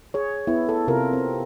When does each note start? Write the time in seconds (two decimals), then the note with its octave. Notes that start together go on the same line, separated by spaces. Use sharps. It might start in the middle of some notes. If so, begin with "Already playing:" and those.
0.14 G#4 C#5
0.47 B3 E4
0.69 A4
0.88 C3 F4 A4 A#4
1.13 C4